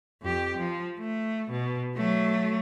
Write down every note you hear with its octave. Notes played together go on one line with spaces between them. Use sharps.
F2 G4
F3
A3
B2
F#3 A3